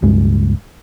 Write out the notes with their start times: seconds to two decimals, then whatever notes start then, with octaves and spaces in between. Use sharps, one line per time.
0.02 C#2 G2 G#3